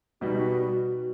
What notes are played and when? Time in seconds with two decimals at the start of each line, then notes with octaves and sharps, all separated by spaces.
0.21 B2 G3 B3 D#4 F#4